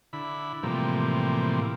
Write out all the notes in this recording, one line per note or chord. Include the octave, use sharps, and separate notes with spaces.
D3 E4 B5
A2 C3 E3 F3 G3 A#3